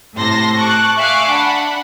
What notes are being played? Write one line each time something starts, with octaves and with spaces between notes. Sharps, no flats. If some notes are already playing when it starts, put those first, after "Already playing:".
A2 C3 A5 C6 A#6
A5 C#6 D6 F#6
E5 F5 G#5 C#6 D6 F#6
D4 F#5 B5